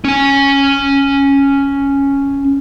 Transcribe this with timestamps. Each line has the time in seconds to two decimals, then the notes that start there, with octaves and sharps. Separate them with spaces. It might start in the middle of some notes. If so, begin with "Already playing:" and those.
0.05 C#4 G#5